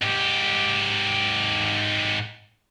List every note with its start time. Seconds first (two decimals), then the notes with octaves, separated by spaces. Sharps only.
0.02 G#2 G4